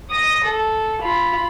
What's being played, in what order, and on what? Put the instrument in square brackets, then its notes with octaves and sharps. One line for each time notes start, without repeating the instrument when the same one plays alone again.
[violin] D#6 A#6
A4
F4 B5